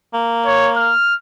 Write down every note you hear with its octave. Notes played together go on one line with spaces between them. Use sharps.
A#3
C#5
F6